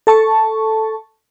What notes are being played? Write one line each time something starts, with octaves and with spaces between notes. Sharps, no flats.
A4 A5 C#6